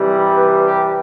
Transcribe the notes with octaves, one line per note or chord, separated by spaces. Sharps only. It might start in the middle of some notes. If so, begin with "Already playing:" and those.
Already playing: C3 E3 G3
B4
G4